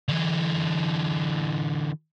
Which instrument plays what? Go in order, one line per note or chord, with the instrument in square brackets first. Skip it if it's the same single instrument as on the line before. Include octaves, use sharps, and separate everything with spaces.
[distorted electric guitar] D3 E3